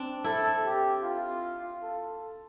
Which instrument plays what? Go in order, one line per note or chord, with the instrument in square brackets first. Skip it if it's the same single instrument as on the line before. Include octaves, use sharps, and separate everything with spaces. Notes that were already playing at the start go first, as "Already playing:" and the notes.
Already playing: [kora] C4 D4
[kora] E4 [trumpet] A4
[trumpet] G4
F4
A4